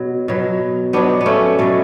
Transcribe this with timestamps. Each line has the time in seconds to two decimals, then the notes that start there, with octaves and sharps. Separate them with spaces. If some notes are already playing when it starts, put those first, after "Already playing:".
Already playing: B2 F#3
0.28 B2 F#3
0.93 B2 F#3 B3 D4
1.21 B3
1.26 A3 C#4
1.59 B2 F#3 A3